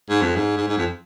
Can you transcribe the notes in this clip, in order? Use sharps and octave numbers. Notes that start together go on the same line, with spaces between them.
G#2
F2
G#2
G#2
G#2
F2